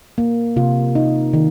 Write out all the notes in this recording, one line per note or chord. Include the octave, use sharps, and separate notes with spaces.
A#3
C3 F4
D#4
D#3